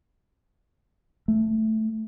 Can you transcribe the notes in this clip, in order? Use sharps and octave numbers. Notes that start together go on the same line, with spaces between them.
A3